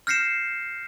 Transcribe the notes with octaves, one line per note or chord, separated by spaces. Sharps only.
F6 G6 A#6 C7 C#7 E7